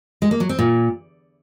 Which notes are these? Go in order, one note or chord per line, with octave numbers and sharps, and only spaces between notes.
G#3
A#3
F#3
C4
A#2